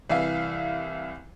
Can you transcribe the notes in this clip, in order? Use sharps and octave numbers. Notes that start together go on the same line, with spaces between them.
C2 E3 E5 F5 C7